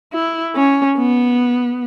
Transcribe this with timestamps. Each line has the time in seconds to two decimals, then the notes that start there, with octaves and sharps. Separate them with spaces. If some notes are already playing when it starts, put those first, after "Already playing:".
0.13 E4
0.56 C#4
0.98 B3